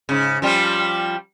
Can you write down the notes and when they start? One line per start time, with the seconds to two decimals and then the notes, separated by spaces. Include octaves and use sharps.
0.09 G#2 C#3
0.42 F3 G3 F4